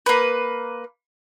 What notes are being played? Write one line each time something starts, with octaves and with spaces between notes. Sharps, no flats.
A#3 B4